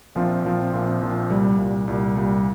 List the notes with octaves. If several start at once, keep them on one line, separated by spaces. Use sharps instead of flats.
A#1 A#2 F3 C4 F4
A#1 A#2 F3 C4 F4
A#1 A#2 F3 C4 F4
A#1 A#2 F3 C4 F4
C2 A#2 G3
C2 A#2 G3
C2 A#2 G3
C2 A#2 G3